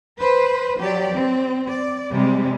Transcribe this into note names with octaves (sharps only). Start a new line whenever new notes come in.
B4 C5
F#3 G4 D5
C4
D5
C3 G3 G#3